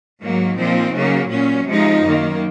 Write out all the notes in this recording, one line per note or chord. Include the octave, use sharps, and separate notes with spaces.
G#2 F#3 A#3
A#2 F3 C4 D#4
C#3 F#3 A#3
A#2 F#3 C#4
C3 F3 G#3 D#4
F#2 D#3 A#3